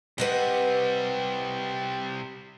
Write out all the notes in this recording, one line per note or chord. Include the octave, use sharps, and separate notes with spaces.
C3 G3 B4 D#5 F#5